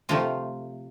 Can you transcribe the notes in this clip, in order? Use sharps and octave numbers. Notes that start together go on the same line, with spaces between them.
C3 F3 A3 F4